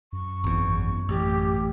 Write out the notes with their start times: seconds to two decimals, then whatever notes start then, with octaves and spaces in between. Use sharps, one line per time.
0.13 F#2 C#6
0.44 G#1 E2
1.09 A1 G4